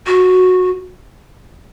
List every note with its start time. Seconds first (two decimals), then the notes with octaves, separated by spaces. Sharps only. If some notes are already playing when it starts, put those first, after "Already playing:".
0.07 F#4